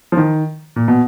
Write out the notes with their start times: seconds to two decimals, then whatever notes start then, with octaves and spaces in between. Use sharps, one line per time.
0.12 F3
0.17 D#3
0.76 A#2
0.88 B2